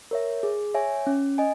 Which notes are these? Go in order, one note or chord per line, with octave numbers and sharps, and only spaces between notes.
A#4 C#5 E5
G#4
C#5 E5 G#5
C#4
D#5 G#5